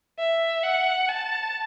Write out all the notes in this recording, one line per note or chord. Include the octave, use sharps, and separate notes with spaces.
E5
F#5
A5